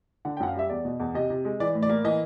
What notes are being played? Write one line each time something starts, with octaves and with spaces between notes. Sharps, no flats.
D3 F#5
G5
F#2 F#5
F5
G3 E5
E2 D5
B2
E2
C3 D#5
C3
G#3
E3 D5
A2
D5
A#3
E3 D#5